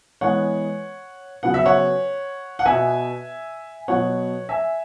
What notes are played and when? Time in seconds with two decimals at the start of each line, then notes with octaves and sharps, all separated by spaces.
0.21 E3 G#3 B3 C#5 F#5
1.43 C#3 F#3 B3 F#5
1.54 E5
1.66 C#5 F#5
2.59 F#5
2.65 B2 B3 E5 G#5
3.88 B2 F#3 B3 C#5 F#5
4.49 E5 G#5